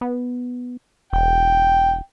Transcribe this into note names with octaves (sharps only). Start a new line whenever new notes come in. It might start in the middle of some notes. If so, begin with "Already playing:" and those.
B3
E1 G5